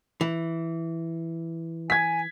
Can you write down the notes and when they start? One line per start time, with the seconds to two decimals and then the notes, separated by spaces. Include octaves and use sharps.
0.21 E3
1.90 G#5 G#6 B6